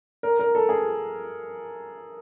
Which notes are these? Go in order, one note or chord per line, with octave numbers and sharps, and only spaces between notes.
A#4
A#4
A4
G#4